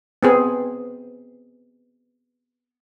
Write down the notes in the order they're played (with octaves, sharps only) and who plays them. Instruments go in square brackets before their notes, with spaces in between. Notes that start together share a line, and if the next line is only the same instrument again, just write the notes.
[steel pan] B3 C4 G#4